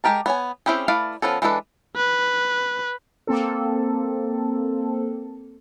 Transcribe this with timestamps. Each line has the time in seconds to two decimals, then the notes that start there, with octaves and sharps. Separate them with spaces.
0.04 G#3 D#4 G4 A#4 A5
0.26 B3 C#5 G#5
0.66 C4 C#4 E4 G4 G#4
0.88 A3 E4 B4 D5 F5
1.22 F3 B3 C#4 A4
1.42 E3 G#3 D4 A4 B4
1.96 B4
3.27 A#3 C4 A4